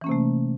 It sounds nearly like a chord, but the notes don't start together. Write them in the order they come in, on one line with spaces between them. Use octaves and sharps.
E3 C#4 A#3 C3 A3